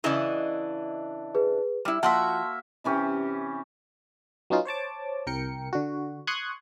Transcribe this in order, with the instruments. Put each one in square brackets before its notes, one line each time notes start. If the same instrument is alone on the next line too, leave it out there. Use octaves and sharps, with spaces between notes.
[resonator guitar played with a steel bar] C#3 E3 E4 [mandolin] D4 D#5
[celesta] G#4 B4
[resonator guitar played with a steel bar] G3 E4
[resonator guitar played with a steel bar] F3 F#5 [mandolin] A#3 F#4 E5 [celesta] A5 C6
[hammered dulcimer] C3 E3 C#4 G4
[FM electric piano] F#3 B3 C#4 D#4 F4
C5 C#5 A5 D6
C2 A#4 G5 C#7
D3 F#4
C6 C#6 D#6 F#6 G#6